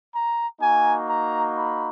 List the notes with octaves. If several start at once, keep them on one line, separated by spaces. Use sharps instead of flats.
A#5
A#3 D#4 F#4 G#5
A#5
B5